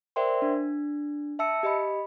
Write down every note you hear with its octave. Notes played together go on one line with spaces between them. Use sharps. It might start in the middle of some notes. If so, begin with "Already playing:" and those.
A#4 C5 D5 E5 G5 C6
D4
E5 A5 E6 C#7
G4 D#5 B5